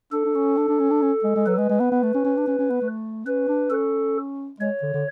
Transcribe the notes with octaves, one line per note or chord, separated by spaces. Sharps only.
D4 A4
D4
C#4
D4
D4
C#4
D4
C#4
G#3
G#3
F#3 B4
G#3
G#3
B3
B3
A3
C#4
C#4
D4
C#4
C#4
B3
A3
C#4 B4
D4
C#4 A4
G#3 C#5
D3
D3